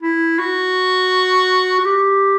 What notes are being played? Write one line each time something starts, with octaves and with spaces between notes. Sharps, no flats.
E4
F#4
F#4
G4